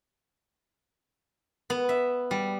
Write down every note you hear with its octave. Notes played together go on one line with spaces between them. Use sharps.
B3
E5
G3